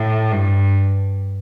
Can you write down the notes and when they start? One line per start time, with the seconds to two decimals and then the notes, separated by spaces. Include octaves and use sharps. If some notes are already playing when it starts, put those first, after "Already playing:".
Already playing: A2
0.32 G2